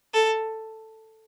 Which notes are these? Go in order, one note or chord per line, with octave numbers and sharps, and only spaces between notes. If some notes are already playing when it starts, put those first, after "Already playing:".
A4